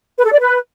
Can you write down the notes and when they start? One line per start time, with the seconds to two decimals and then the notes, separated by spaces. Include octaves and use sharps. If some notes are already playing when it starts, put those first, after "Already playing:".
0.17 B4
0.24 A4
0.32 D5
0.39 B4